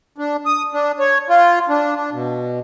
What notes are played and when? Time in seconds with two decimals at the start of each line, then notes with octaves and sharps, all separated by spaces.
0.18 D4
0.46 D#6
0.74 D4
1.00 C#5
1.29 F4
1.69 D4
1.96 D4
2.13 B2